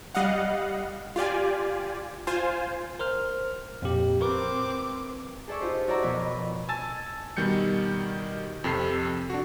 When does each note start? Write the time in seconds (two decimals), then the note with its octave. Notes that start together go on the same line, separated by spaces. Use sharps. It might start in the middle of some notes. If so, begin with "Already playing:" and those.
0.15 G3 D#5 F5 F#5
1.16 F4 G4 D5 G#5
2.27 F4 C5 G#5
2.99 A#4 C5 F6
3.82 F2 A#2 G4
4.21 C4 A#4 B4 D6
5.48 G#4 A4 D5 E5 C#6
5.61 D#4 F4 G4 C5
5.87 E4 F#4 C#5 D5 E5 A#5
6.02 F2 B2 B3 A#4 B4
6.69 G#5 A5 E6 A6
7.37 B2 D#3 G3 G6 C#7
8.64 F2 C3 A4 C7
9.30 D4 F#4